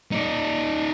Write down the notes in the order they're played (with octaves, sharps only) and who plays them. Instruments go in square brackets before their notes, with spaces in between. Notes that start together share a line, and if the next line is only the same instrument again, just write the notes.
[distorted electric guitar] D#4 D5